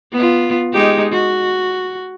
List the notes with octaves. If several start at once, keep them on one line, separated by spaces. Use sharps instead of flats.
B3 F4
G#3 D#4 G4
F#4